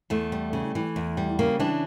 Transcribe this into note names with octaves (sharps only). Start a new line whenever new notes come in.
E2 A3
G3
C#3
E3
E2
G3
C#3 A#3
E3 D4